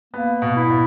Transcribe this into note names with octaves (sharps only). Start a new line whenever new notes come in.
A#3 B3
B2
E4
B2